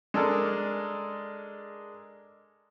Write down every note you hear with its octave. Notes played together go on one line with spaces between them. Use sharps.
G#3 D4 A4 A#4